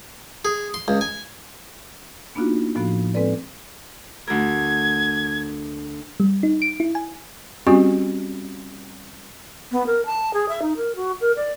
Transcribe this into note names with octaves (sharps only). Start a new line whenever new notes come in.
G#4
C6
C#2
G#5
A#3 B3 D4 D#4 F4 F#4
A2 F3 B3 F#4
G#3 C4 A4 B4 D5
D2 A#4 G#6
G3
D#4
D7
E4
G#5
G3 C4 C#4 F#4 G4
B3
A#4
A5
G#4
E5
D#4
A#4
F#4
A#4
D5